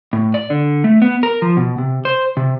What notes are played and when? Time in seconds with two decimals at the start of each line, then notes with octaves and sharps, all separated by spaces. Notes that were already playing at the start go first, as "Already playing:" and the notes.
0.13 A2
0.34 D5
0.50 D3
0.84 A3
1.02 B3
1.23 A#4
1.42 F3
1.57 B2
1.78 C3
2.05 C5
2.37 C3